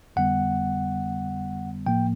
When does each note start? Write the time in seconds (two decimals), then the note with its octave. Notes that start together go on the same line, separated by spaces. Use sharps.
0.16 F2 D3 G3 B3 F#5
1.86 A2 F3 A#3 G5